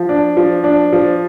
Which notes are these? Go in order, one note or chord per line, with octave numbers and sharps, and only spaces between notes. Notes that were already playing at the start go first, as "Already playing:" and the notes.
Already playing: F3
D4
F3
D4
F3